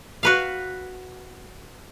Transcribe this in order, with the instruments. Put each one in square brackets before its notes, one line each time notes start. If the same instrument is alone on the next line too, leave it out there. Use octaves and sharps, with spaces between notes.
[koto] F#4 B4 F5